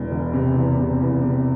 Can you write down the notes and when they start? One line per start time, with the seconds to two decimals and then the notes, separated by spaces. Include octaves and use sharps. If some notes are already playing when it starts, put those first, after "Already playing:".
Already playing: E1 E2
0.11 E1
0.33 C3
0.56 E2
0.79 C3
1.01 E2
1.23 C3